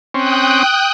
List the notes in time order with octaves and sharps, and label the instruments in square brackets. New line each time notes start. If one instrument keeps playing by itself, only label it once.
[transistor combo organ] C4 C#4 [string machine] G5 D#6 F#6